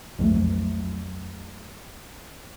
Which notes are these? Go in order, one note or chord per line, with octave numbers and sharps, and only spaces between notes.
B1 F2 F#3 A3